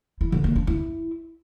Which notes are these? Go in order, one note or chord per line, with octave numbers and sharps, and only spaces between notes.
E4
D3
A#3
D4
E4